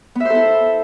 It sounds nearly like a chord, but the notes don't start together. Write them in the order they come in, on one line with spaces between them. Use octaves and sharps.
B3 E5 C5 A4 E4